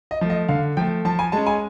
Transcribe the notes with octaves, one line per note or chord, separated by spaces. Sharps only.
D#5
F3 A3
D#5
D3 F5
F3 A3 G5
F3 A5
G#5
G#3 C#4 A5
G#5